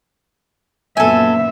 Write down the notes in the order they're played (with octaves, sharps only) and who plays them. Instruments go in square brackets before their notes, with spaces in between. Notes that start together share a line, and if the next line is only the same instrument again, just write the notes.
[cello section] F#2 A#2 B3 [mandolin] A4 G#5 [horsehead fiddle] E5